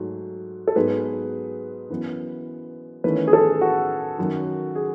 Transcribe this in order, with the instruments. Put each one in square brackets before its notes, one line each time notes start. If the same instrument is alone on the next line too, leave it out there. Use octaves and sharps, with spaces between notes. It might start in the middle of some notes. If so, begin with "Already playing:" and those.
Already playing: [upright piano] G#2 F#3 A3
[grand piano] A4
[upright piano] G#2 F#3 B3 D#4 G#4 [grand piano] B4
[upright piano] F#2 E3 B3
[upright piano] E2 D#3 A3 C#4 E4 [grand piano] B4
[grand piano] G#4
A4
F#4
[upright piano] F#2 D#3 F#3
[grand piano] G#4